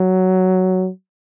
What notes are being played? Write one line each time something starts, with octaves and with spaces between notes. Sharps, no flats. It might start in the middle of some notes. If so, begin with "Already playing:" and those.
Already playing: F#3